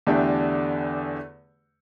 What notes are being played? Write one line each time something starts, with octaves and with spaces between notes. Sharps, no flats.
E2 D3 A3 D4 G4